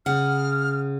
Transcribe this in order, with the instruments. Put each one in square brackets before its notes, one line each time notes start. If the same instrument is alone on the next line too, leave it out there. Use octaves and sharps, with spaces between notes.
[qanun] C#3 [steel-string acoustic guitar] F#5 [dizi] F6